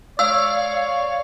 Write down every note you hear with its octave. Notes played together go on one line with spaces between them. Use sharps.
C#5 D5 F5 E6